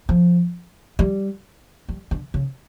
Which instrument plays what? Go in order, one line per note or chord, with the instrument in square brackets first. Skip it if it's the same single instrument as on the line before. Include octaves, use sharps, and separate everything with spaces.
[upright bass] F3
G3
G3
D3
C#3